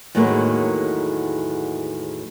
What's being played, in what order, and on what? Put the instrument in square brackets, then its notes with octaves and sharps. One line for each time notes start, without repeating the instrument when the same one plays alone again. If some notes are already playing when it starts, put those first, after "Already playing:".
[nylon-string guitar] E2 A2 D#3 F#3 G#3 A#3